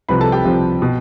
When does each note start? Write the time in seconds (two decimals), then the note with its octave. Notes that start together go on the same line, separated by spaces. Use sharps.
0.09 C2 C3 F3 B4 B5
0.20 A4 A5
0.32 G4 G5
0.44 C2 C3 F3
0.82 B2